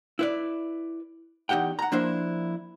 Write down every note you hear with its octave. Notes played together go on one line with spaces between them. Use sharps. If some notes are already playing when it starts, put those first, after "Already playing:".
E4 B4 D5
E2 D#4 G4 F#5 G5
F#5 A#5
F3 A#3 D4 E4 C5